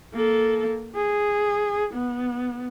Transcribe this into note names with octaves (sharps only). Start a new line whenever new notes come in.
A#3 A4
G#4
B3